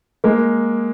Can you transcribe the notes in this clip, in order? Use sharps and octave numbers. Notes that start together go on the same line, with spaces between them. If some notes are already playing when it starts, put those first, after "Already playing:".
G#3 A#3